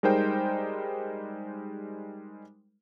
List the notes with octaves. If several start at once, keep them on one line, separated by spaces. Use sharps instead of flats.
G3 G#3 D#4 A#4 C5 G5